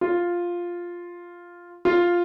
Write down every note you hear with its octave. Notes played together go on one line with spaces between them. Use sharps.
F4
F4